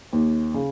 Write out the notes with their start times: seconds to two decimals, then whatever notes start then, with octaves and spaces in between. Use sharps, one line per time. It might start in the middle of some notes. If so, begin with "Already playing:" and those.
0.13 D#2
0.54 C#3